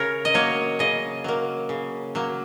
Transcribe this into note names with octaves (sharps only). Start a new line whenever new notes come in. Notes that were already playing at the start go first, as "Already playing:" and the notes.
Already playing: C#3 A#4 C#5
D#5
F#3 A#3 C#5
C#3 D#5
F#3 A#3
C#3
F#3 A#3